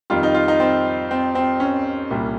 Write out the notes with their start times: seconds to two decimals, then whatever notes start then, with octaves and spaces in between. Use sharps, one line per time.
0.10 F2 D#3 G3 F4
0.23 D#4
0.35 F4
0.48 D#4
0.60 C4
1.11 C4
1.35 C4
1.60 C#4
2.10 C2 A#2 G3